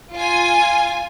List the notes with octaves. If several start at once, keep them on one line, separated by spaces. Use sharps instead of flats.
F4 G#5